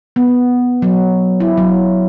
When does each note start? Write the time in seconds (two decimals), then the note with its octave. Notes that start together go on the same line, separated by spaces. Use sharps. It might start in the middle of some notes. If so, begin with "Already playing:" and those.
0.16 B3
0.82 F#3
1.40 E4
1.58 F#3